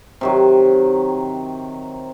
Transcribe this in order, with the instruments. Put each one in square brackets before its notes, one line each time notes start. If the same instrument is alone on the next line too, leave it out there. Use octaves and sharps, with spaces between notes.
[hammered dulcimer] C3 D#3 F#3